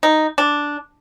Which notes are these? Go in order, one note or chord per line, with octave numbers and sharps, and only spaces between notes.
D#4
D4